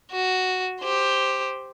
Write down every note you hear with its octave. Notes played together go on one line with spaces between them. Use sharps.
F#4
G4 C5